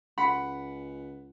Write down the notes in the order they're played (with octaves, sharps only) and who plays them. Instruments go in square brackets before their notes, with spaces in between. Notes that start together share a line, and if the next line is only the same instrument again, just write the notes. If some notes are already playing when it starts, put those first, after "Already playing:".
[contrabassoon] C#2 [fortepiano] F#5 B5